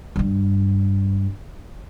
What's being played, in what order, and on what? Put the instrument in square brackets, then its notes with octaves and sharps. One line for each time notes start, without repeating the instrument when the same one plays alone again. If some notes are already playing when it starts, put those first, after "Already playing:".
[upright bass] G2 G3